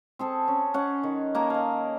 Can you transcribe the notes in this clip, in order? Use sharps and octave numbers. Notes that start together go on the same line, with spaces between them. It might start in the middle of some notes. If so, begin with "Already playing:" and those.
C4 G#4 A4
C#4
C#4 F#5
D#3
A#3 A4 G#5 A#5
D#5 F5